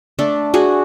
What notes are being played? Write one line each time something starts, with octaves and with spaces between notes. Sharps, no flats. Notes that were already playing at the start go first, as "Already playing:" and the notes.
A3 D4 A4
D4 F#4 G#4